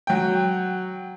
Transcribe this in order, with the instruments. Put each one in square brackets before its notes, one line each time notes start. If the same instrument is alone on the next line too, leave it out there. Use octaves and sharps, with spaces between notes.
[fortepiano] F#3 G5